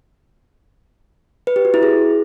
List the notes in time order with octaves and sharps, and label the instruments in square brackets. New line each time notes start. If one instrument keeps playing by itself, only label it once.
[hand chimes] B4
G4
F#4
E4
G#4